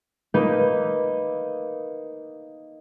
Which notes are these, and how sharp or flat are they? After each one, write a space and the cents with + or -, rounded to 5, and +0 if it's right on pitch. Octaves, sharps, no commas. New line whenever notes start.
A#3 +0 D#4 +0 B4 +0